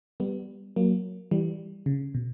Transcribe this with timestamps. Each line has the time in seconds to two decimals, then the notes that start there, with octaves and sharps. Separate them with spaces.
0.20 G3 B3
0.76 F#3 A#3
1.31 E3 G3
1.86 C#3
2.15 B2